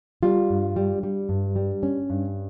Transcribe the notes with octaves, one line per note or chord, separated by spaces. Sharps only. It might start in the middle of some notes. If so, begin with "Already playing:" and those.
G3 F4
G2
G3
G3
G2
G3
C#4
G2